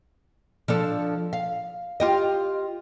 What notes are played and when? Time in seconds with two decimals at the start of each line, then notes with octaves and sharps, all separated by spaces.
0.68 F3 D4 A4
1.33 F5
2.00 F4 G4 D#5